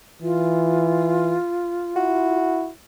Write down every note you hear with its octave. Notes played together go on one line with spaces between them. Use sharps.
E3 F4
E4 F#4